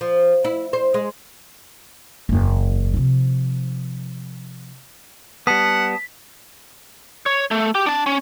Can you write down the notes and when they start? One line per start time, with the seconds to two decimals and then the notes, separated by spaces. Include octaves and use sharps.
0.01 F3
0.44 E4
0.73 C5
0.94 G#3
2.29 F#1 E2
2.94 C3 F3
5.47 G3 B3 F#5 A5 D#6 B6
7.26 C#5
7.51 A3
7.75 G4
7.86 D4 A5
8.06 C#4